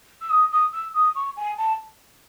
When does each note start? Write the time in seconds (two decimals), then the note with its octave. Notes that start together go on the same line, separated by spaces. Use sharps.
0.21 E6
0.30 D#6
0.51 D#6
0.72 E6
0.94 D#6
1.15 C#6
1.36 G#5
1.58 A5